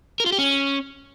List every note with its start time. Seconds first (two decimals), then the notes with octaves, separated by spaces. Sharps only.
0.20 A#4
0.26 F4
0.32 G4
0.39 C#4